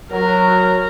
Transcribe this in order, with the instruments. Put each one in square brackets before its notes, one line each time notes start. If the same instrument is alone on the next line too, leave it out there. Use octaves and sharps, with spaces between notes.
[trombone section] F#3 [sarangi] A#4